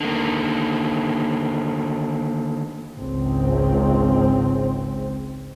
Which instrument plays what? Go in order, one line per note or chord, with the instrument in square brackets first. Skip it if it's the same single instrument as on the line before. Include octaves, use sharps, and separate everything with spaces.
[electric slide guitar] D3 D#3 A#3
[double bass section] G#1 C#2 C4